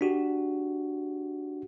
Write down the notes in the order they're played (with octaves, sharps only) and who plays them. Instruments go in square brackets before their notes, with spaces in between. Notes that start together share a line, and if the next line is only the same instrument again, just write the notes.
[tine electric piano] D4 F#4 G4